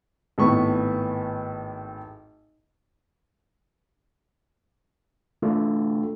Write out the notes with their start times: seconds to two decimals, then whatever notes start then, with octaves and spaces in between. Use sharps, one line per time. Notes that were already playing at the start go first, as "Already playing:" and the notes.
0.38 G#1 A2 B3 B4 C#6
5.42 A3 D4 F4 A4